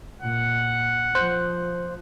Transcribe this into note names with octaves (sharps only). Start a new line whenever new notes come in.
A#2 F#5
F3 C5 F#6